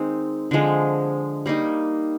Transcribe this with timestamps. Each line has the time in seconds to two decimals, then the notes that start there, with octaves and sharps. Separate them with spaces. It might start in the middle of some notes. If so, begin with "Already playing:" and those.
Already playing: D#3 G#3 C4 D#4
0.51 D3 F3 G#3
1.46 G3 A#3 D#4